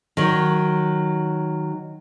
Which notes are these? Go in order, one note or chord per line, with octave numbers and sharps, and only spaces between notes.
D#3 F#3